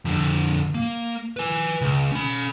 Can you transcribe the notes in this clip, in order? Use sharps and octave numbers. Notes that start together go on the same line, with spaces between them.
F2 D3
A#3
B4 G#5
C#2
C#4 B5